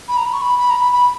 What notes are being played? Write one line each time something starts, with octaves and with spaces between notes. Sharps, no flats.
B5
A#5
B5
C#6
B5
B5
A#5
B5
B5